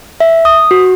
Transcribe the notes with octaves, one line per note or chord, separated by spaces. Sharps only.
E5
D#6
F#4